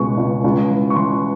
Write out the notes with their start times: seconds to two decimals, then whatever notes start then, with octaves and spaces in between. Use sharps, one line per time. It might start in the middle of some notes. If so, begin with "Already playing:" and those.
Already playing: C#2 B2 G#3 C#6
0.18 C#2
0.44 C#2
0.71 E3
0.90 C#6
0.96 E3 C6